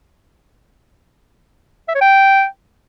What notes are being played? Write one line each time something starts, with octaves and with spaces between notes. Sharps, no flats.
E5
C#5
G5